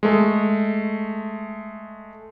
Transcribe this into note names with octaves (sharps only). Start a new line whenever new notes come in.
G#3 A3